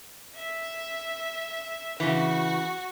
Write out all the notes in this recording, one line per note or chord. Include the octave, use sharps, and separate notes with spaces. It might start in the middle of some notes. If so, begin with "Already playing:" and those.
E5
C#3 E3 F#4